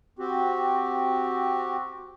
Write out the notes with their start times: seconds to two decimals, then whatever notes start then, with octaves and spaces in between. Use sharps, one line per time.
0.19 C4 F#4 G4